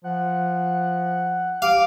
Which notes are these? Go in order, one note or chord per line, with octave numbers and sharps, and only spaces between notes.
F3 F#5
G4 F5 D6